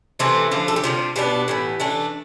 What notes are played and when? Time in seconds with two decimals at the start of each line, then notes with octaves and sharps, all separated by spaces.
0.19 C3 E3 A3 C4 E4
0.51 D3 F3 A3
0.68 A4
0.76 G4
0.84 C3 G3 D4 F4
1.16 B2 B3 D4 G4
1.48 A2 E3 B3
1.80 E3 A3 D4